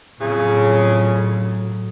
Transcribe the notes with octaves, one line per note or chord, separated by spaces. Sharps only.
F2 A2 C#3 F#3